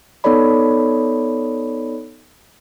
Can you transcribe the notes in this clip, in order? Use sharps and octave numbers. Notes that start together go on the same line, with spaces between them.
B3 D#4 A4 C#5 D5 B5